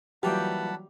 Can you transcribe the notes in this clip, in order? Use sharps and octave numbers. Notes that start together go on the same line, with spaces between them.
A#2 E3 F#3 G3 G4 F#5 A5 B5